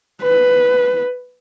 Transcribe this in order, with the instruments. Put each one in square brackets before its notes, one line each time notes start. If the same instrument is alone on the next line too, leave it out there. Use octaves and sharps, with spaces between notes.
[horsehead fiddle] B4